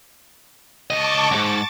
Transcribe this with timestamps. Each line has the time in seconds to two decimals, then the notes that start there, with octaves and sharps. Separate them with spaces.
0.90 C#2 D#5 A5 C#6 D6
1.31 C2 G#2 A6